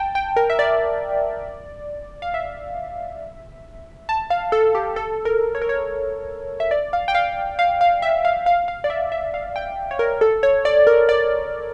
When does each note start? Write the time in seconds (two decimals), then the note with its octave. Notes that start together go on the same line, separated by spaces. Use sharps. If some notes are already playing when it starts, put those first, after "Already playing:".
Already playing: G5 A5
0.15 G5
0.36 A#4
0.50 E5
0.59 D5
2.22 F5
2.34 E5
4.09 A5
4.30 F5
4.52 A4
4.75 G4
4.96 A4
5.25 A#4
5.55 C#5
5.62 A#4
5.69 C#5
6.60 E5
6.71 D5
6.93 F5
7.08 G5
7.15 F5
7.59 F5
7.81 F5
8.02 E5
8.25 F5
8.46 F5
8.68 F5
8.84 D5
8.90 E5
9.12 E5
9.34 F5
9.56 G5
9.91 C#5
9.99 A#4
10.21 A4
10.43 C#5
10.65 D5
10.87 A#4
11.09 D5